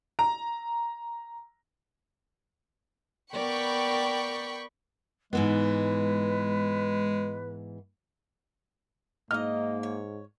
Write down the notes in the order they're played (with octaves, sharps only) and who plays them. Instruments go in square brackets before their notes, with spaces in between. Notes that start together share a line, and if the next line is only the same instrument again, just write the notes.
[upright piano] A#5
[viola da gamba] B3 A#4 D5 [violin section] G5 B5 C#6
[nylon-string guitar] G#2 E3 B3 [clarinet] G#3 [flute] B4
[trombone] G#2 [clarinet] A#3 [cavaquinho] D#4 D#5 [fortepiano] F6
[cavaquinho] C#5